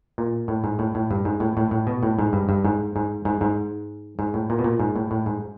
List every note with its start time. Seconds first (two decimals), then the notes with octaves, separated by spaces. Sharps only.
0.18 A#2
0.48 A2
0.64 G#2
0.79 A2
0.95 A2
1.11 G2
1.25 G#2
1.40 A2
1.57 A2
1.71 A2
1.87 B2
2.03 A2
2.19 G#2
2.33 G2
2.49 G2
2.65 G#2
2.96 G#2
3.25 G#2
3.41 G#2
4.19 G#2
4.34 A2
4.50 A#2
4.59 B2
4.64 A#2
4.80 G#2
4.96 A2
5.11 A2
5.26 G#2